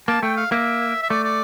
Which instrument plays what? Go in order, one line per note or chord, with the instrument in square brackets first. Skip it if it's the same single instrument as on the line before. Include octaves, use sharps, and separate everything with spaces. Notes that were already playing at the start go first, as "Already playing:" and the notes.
[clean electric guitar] A#3 [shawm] A5
[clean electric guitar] A3 [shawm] G5
[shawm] F5
[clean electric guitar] A#3 [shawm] E5
[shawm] E5
[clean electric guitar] A3 [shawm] D5
[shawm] D5